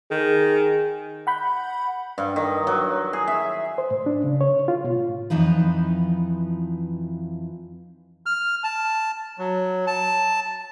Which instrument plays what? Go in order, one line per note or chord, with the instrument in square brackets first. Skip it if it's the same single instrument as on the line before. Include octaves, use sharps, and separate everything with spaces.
[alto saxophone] D#3 [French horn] G#4
[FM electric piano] F#5 B5 G6
[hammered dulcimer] G2
D#3
F#3
G#4
E5
[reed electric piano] C5
A2
D4
C#3
C#5
F4
B2
A2
[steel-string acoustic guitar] F2 E3 F3 D#4 B4
[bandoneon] F6
A5
F#3
A5